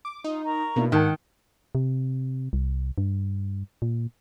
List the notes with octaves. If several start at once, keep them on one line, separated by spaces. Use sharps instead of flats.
D6
D#4 F4 D#6
A#4 A#5 C#6
B2 A#3 D4 E4
G#2 D#3 A#4 F#5 G5 A5 F#6 G#6
C3
C2
G2
A#2